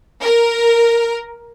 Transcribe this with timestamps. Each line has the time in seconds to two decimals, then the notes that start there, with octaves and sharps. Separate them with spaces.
0.21 A#4